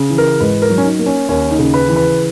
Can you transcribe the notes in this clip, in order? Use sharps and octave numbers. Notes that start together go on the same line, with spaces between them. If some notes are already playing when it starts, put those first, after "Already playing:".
Already playing: C#3
E3
A#4
G#2 B4
A#4
F#3
C#4
D#4
A#3
C#4
D#2 C#4
D#4
C#3
B4
E3
B4